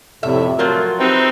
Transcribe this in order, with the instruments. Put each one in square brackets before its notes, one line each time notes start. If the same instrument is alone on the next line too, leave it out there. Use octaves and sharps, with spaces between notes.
[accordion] F2 A2 C3 [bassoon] A3 [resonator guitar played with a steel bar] E5
[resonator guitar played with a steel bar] F3 F#3 F4 [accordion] A3 [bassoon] A#4
[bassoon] C3 [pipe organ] C4 D#4 [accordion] B4 C6 E6